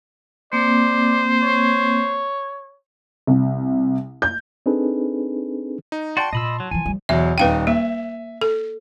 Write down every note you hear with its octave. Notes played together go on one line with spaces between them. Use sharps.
A#3 C4 C5 D5
C#5
C2
G6
C4 D4 D#4 G#4 A4 B4
D#4
F#4 D5 G5 A5 C6
A#2 D#5 B5 E6
F#3
E3 F3 G#5
F3 G3
E2 B2 F#3 E5
D#1 D#4 B4 F5 G5 D#7
A#3 E5
A4